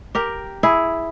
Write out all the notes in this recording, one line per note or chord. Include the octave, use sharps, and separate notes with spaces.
G4 A#4
E4 G#4